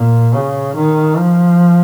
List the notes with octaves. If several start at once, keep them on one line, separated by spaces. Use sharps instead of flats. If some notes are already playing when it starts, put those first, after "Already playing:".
Already playing: A#2
C#3
D#3
F3